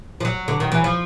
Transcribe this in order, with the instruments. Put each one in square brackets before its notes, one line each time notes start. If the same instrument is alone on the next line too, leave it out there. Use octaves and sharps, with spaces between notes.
[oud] F3
F#3
D3
D#3
E3
F3